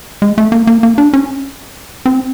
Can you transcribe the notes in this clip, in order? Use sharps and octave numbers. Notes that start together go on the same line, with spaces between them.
G#3
A3
A#3
A#3
A#3
D4
C#4
C4